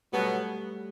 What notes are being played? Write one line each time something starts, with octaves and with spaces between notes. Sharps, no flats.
B2 F#3 G3 A3 B3